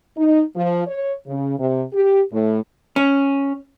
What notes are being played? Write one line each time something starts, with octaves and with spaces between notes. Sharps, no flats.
D#4
F3
C#5
C#3
C3
G4
A2
C#4